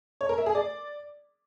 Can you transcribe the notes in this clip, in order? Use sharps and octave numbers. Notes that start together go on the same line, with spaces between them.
C#5
A#4
E5
G#4
D5